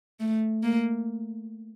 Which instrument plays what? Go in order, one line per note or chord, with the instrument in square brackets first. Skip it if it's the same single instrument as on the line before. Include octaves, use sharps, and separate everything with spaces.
[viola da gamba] A3
A#3